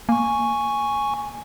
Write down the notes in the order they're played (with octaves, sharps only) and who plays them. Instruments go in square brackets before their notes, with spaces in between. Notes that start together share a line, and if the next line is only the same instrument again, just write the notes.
[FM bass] A#3 [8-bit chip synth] G#5 C#6